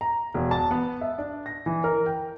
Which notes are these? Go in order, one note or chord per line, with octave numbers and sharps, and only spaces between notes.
A#5
E1
A5
B3
E5
D4
A#6
E3
A#4
G5